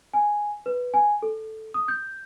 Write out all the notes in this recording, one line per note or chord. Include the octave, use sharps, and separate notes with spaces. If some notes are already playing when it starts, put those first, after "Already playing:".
G#5
B4
G#5
A4
D#6
G6